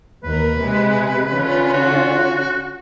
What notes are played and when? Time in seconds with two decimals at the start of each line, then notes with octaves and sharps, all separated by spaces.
0.24 D#2 A#4 B4
0.57 C3 G#3
1.28 D3 C#4 F4
1.73 F#4